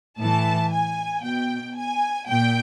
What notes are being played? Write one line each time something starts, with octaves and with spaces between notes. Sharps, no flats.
A2 A5
E3
G#5
B2 G5
G#5
A#2 G5